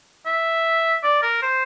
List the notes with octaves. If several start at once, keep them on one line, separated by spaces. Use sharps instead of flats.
E5
D5
A#4
C5